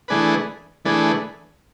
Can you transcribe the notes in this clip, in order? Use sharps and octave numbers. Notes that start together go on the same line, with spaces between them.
E3 A3 D4 G#4 B4
E3 A3 D4 G#4 B4